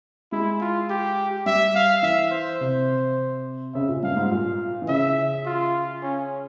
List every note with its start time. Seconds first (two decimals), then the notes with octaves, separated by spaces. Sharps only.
0.32 G#3 E4
0.61 F4
0.90 G4
1.46 G3 E5
1.75 F5
2.03 E3 E5
2.32 C5
2.61 C3
3.74 C#3 E5
3.89 A#2
4.03 G2 F5
4.17 G#2
4.31 A#2 F5
4.82 E3
4.88 C#3 E5
5.46 F4
6.02 C#4